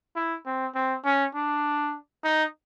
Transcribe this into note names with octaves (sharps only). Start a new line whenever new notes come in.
E4
C4
C4
C#4
D4
D#4